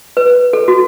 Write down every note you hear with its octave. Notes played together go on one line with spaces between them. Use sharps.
B4
A4
F#4